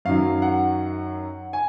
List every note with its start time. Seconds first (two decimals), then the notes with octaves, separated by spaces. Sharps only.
0.05 F#2 D#3 F#3 F5
0.42 F#5
1.53 G#5